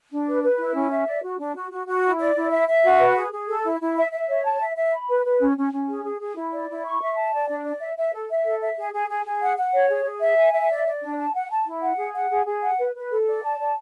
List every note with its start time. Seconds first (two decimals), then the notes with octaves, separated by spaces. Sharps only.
0.11 D4
0.28 B4
0.43 B4
0.59 E4
0.75 C#4
0.91 E5
1.07 D5
1.23 F#4
1.39 D4
1.56 F#4
1.71 F#4
1.87 F#4
2.04 E4
2.19 D5
2.36 E4
2.51 E5
2.68 E5
2.84 F#4
3.00 B4
3.16 G#4
3.31 G#4
3.48 A4
3.64 E4
3.80 E4
3.97 E5
4.12 E5
4.28 C#5
4.45 A5
4.61 E5
4.76 E5
4.93 B5
5.09 B4
5.25 B4
5.40 C#4
5.57 C#4
5.73 C#4
5.88 G#4
6.04 G#4
6.21 G#4
6.36 E4
6.53 D5
6.69 E4
6.85 C#6
7.01 E5
7.17 A5
7.34 D5
7.49 D4
7.64 D5
7.81 E5
7.97 E5
8.13 A4
8.29 E5
8.45 A4
8.61 E5
8.78 G#4
8.93 G#4
9.09 G#4
9.25 G#4
9.42 F#5
9.57 F#5
9.74 C#5
9.90 G#4
10.06 G#4
10.22 E5
10.37 G#5
10.54 E5
10.70 D5
10.86 D5
11.01 D4
11.19 A5
11.34 F#5
11.50 A5
11.66 E4
11.82 F#5
11.98 G#4
12.14 F#5
12.31 G#4
12.46 G#4
12.63 F#5
12.79 B4
12.95 B4
13.11 A4
13.26 D5
13.42 A5
13.59 D5